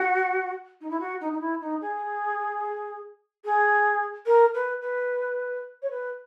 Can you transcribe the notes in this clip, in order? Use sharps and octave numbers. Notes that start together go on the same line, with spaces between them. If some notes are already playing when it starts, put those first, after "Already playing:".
Already playing: F#4
D#4
E4
F#4
D#4
D#4
E4
D#4
G#4
G#4
A#4
B4
B4
C#5
B4